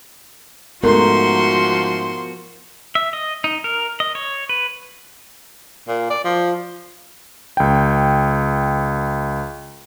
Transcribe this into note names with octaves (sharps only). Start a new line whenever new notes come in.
G#2 F3 A3 B3 F#4 A#4 C6
E5
D#5
D#4
A#4
D#5
C#5
B4
A#2
D5
F3
C#2 G5